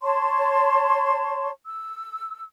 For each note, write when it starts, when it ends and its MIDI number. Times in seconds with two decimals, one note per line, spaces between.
0.01 1.50 73
0.01 1.50 81
0.01 1.50 84
0.01 1.50 85
1.65 2.43 88